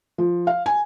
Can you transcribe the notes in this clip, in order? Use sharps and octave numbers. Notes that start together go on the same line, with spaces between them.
F3
F5
G#5